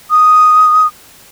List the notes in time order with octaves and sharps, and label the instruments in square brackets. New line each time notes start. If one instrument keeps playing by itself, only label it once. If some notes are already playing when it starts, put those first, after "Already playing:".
[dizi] D#6